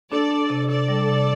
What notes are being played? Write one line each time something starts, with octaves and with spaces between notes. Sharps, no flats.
D4 A4 D5
D4
C3
C3 A4 D5
G3
C3